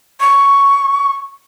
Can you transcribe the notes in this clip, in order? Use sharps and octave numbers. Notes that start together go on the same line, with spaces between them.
C#6